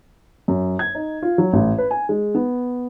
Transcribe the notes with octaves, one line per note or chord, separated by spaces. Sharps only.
F#2
G#6
D#4
F4
F#3
A1
B4
G#5
G#3
B3